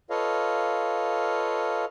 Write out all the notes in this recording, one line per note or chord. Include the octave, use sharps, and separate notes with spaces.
F4 A4 B4 C#5 D#5 F5